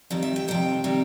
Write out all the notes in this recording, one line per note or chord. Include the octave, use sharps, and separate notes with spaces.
F2 C3 D#3 G3
E5
G5
F2 C3 D#3 G3 G5
C3 D#3 G3